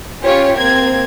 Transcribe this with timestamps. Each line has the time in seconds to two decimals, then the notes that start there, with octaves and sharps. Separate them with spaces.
0.22 C#4 F4 G4 C#5
0.58 A#3 C4 G#6